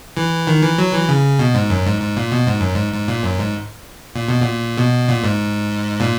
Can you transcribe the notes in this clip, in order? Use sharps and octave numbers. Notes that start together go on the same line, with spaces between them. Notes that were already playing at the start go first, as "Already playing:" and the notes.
E3
D#3
E3
F#3
E3
C#3
B2
G#2
F#2
G#2
G#2
A#2
B2
G#2
F#2
G#2
G#2
A#2
F#2
G#2
A#2
B2
A#2
B2
A#2
G#2
A#2